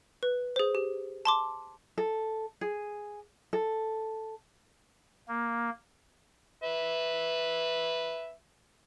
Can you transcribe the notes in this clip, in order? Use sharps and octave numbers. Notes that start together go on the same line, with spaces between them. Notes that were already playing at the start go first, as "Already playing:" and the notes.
B4
G#4 C5
G4
A5 C6 D6
A4
G#4
A4
A#3
B4 E5